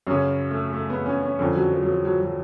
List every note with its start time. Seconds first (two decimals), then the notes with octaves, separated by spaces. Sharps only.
0.07 F#2 C#3 C#4
0.51 A3
0.73 A3
0.90 B3
1.06 C#4
1.22 C#4
1.39 F2 D3 C#4
1.55 F#3
1.72 F3
1.83 F#3
1.88 F3
2.05 F#3
2.21 F#3